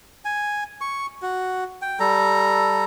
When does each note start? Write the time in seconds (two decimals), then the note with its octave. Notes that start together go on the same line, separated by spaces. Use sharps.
0.25 G#5
0.81 C#6
1.22 F#4
1.82 G5
2.00 G3 A4 A#5